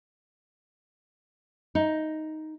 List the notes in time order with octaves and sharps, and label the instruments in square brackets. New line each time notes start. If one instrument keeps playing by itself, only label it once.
[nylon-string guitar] D#4